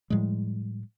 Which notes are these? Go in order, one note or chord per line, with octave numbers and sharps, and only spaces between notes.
A2 F3 G3 G#3